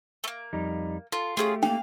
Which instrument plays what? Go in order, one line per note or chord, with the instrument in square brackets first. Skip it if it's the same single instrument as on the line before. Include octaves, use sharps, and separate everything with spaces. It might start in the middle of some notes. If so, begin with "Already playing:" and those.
[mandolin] A3 A#3
[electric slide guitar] F2 G3 D#4
[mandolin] F4 [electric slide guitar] A4
[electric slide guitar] A3 G4 [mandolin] C#4 E4 F4 [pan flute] G#4
[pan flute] A#3 [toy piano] C#4 [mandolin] F5